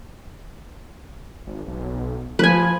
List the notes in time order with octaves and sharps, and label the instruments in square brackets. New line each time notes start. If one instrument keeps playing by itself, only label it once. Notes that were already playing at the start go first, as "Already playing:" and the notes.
[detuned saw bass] G#1
B1
[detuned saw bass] F3 [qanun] B4 G#5